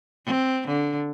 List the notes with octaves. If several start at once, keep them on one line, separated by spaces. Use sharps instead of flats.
C4
D3